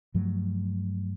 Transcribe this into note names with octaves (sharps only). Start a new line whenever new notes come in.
G2 F3 F#3 A3